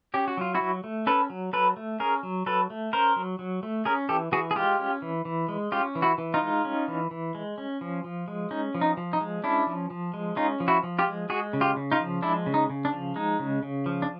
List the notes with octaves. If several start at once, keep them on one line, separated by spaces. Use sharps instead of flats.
C#4 G4
F#4
F#3 F4
E4 F#4
F#3
A3
C#4 A4 B4
F#3
F#3 A4 B4
A3
C#4 G#4 A#4
F#3
F#3 A4 B4
A3
C#4 A#4 C5
F#3
F#3
A3
C#4 G#4 A#4
E3 G4 A4
E3 F#4 G#4
G#4
G#3 F4 G4
C#4
E3
E3
G#3
C#4 F4 G4
E3
E4 F#4
E3
D#4 F4
G#3
C#4
E3
E3
G#3
C#4
F3
F3
G#3
C#4 D#4
F3
D#4
F3
D#4
G#3
C#4 D4 E4
F3
F3
G#3
C#4 D#4 F4
F3
E4 F#4
F3
F4 G4
G#3
G#3 F#4 G#4
C#3
F4 G4
C#3
D#4 F4
F3
G#3 D4 E4
C#3
D#4
C#3
D4
F3
G#3 D#4
C#3
C#3
F3
D4